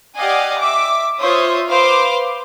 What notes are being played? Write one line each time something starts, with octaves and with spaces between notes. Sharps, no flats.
G4 D5 D#5 F5 F#5 G#5
E5 D6
F4 C5 C#5 E5 D#6
B4 C5 F5 C6 D6